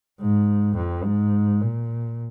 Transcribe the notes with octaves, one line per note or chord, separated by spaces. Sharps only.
G#2
F2
G#2
A#2